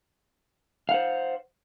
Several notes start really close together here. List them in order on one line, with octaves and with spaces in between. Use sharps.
F5 F#5 C5